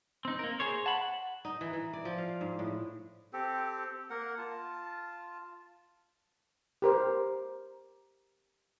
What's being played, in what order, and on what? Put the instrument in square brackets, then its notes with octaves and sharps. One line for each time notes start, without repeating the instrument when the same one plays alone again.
[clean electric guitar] C4 D#4
A#3 A#4
G#4 C5 C#5
[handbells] F#5 [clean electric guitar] A5 B5
[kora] D#4
E3
E3
D5
F3
F5
G#2
A2
[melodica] C4 G4 A4
A#3 A#4 F#5
F4 A5
[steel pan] G4 A#4 C5